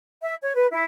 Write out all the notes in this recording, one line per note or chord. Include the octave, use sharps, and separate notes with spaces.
E5
C#5
B4
E4